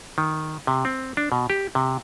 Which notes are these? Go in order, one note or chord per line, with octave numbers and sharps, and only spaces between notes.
D#3
C3
C4
D4
B2
G4
C3